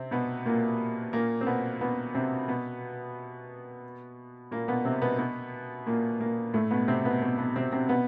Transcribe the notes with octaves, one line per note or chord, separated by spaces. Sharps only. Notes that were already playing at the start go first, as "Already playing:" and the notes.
Already playing: C3 C4
B2 B3
A#2 A#3
A#2 A#3
C4
B2 B3
B2 B3
C3 C4
B2 B3
A#2 A#3
B2 B3
C3 C4
B2 B3
B2 B3
A#2 A#3
A#2 A#3
A2 A3
B2 B3
C3 C4
B2 B3
B2 B3
B2 B3
C3 C4
C3 C4
B2 B3